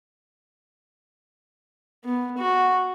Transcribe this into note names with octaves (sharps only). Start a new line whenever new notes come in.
B3
F#4